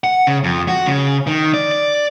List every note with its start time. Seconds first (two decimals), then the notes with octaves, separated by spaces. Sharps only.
0.04 F#5
0.27 C#3
0.44 F2
0.68 F#4
0.87 C#3
1.27 D#3
1.54 D5
1.72 D5